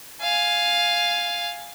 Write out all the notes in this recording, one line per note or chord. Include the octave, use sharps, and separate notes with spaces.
F5 G#5